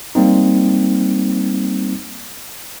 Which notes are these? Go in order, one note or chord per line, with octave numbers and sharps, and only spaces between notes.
G3 A#3 C4 D#4